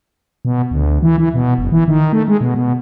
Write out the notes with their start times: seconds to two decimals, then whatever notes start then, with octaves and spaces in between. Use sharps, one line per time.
0.45 B2
0.71 D2
1.02 E3
1.18 E3
1.34 B2
1.58 F#1
1.72 E3
1.88 D#3
2.13 A3
2.28 G#3
2.41 B2
2.55 B2